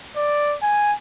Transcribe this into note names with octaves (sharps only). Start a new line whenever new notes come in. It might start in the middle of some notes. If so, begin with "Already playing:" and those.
D5
G#5